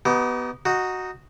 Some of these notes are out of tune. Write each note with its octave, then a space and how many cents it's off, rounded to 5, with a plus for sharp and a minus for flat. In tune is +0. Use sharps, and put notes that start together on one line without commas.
B3 +0 D#4 +10 G4 -35
D#4 +0 F#4 +0